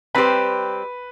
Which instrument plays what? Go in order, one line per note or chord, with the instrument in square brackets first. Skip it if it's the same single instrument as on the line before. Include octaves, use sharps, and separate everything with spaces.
[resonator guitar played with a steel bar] G3 C4 G4 C5 [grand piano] B4